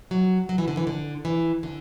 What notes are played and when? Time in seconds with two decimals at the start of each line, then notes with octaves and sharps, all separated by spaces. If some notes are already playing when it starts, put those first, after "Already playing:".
0.11 F#3
0.49 F#3
0.58 E3
0.68 D3
0.77 E3
0.87 D3
1.25 E3
1.63 D3